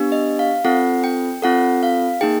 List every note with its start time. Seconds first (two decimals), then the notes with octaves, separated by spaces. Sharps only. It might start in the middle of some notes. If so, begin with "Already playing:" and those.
Already playing: B3 D4 G4
0.12 D#5
0.39 F5
0.64 C4 F4 A4 F#5
1.04 G5
1.42 C4 F4 A4 F#5
1.83 F5
2.21 A#3 D#4 G#4 G5